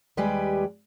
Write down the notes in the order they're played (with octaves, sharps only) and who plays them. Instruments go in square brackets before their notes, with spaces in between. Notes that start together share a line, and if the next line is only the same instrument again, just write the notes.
[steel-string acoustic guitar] D#2 G3 G#3 G4 B4 G#5